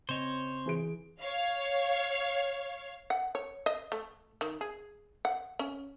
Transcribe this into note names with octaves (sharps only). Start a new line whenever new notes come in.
C#3 C4 C5 C#5 D#5
E3 G#4 D7
C#5 F5
F#5
C#5
D#5
A3
D#3
G#4
F#5
C#4